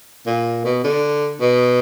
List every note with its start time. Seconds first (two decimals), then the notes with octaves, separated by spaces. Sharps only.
0.26 A#2
0.65 B2
0.84 D3
1.40 B2